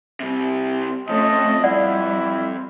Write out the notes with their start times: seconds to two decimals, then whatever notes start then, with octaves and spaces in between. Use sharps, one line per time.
0.20 C3 G3
1.09 F2 F3 A3 C#4 A4 D#5
1.64 G3 E4 D5 F#5